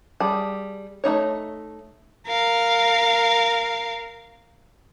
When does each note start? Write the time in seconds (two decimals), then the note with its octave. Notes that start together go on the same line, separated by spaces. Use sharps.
0.20 G3 G#4 A5
1.04 A3 A#3 D#4 C#5
2.27 A#4 F5